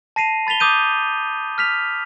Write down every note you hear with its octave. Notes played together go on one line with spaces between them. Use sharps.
A5 A#6 C7 D#7 F7
B5 A6 B6 F7 G7
D6 D#6 G6 D#7
F6 B6 F7